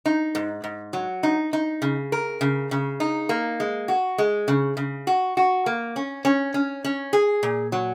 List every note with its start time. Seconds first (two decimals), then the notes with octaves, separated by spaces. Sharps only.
0.06 D#4
0.35 G#2
0.64 G#2
0.93 F#3
1.23 D#4
1.53 D#4
1.82 C#3
2.12 A#4
2.41 C#3
2.71 C#3
3.00 D#4
3.29 A#3
3.60 G#3
3.88 F#4
4.18 G#3
4.48 C#3
4.77 C#3
5.07 F#4
5.37 F#4
5.66 A#3
5.96 C#4
6.25 C#4
6.54 C#4
6.84 C#4
7.13 G#4
7.43 A#2
7.72 F#3